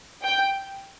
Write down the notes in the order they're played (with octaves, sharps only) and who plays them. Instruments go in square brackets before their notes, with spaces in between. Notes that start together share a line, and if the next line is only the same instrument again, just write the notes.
[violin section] G5